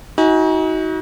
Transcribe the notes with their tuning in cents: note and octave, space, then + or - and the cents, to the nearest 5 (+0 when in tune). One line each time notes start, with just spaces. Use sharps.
D#4 +40 F#4 +10 G#5 +0